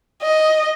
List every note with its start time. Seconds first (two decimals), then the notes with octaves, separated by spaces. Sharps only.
0.22 D#5